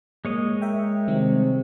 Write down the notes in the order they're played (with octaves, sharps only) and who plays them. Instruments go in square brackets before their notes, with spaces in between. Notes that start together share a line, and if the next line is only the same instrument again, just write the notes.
[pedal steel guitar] G#3 C#5 D#5 [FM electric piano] A#3
[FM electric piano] A#4 E5 G5
[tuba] C3 [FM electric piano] D#3 G3 C4